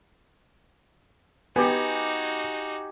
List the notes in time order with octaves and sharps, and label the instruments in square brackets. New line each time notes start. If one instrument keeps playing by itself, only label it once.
[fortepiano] B3 [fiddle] D#4 F#4 [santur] G4 G#5